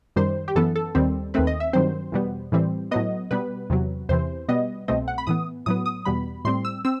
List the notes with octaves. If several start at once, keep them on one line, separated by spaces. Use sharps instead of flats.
F#2 D#3 G3 C5
G4
F#2 E3 B3 A4
A4
D#2 D#3 G3 C4
D#2 D#3 A3 C4 B4
D#5
E5
G2 D#3 F#3 C4 C5
E2 B2 G3 B3
A2 E3 G3 C4
A2 F#3 B3 D#5
B2 G3 B3 B4
E2 C3 F#3
E2 C3 E3 C5
B2 G3 B3 D#5
C2 B2 A3 C4 D#5
F#5
B5
A2 E3 B3 D#6
A2 F#3 B3 D#6
D#6
E2 B2 G3 B3 B5
A2 G3 C4 C6
E6
C4 E6